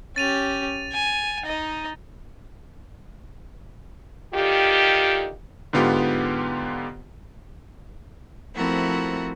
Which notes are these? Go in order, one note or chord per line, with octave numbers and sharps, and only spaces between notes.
C#4 G4 A6 D#7 F7
G#5
D#4 D#5
D3 D#3 F4 G4
G#2 D3 B3 F4 G4
F3 A3 C4 E4 F#4 A#4